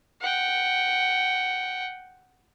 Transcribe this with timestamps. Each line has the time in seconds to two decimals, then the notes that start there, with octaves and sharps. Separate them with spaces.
0.21 F#5 G5